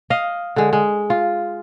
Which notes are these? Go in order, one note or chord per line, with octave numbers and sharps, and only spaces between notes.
D#5 F5
D3 G#3
G#3
F4